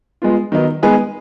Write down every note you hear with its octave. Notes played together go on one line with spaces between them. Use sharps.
G#3 B3 F4
D#3 F#3 B3 D#4
G#3 B3 D#4 G#4 B4